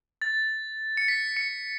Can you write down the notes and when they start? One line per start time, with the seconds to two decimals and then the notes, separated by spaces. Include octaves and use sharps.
0.22 A6
0.97 C#7
1.08 B6
1.37 C#7